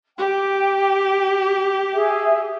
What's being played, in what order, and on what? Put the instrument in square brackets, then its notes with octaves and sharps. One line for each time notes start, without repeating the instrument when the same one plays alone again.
[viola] G4 [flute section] G5
[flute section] G#4 E5